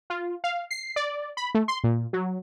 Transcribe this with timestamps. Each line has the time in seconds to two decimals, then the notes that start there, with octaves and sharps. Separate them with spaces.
0.10 F4
0.44 F5
0.71 C7
0.96 D5
1.37 B5
1.54 A3
1.68 C6
1.84 A#2
2.13 F#3